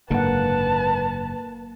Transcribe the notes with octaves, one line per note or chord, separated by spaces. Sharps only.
F#1 G#2 D3 A#3 B4 F#5 A5